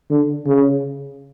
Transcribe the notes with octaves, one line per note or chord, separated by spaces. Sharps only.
D3
C#3